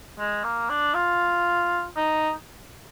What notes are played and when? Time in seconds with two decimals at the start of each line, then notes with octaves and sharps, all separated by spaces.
0.19 G#3
0.44 A#3
0.70 D4
0.94 F4
1.96 D#4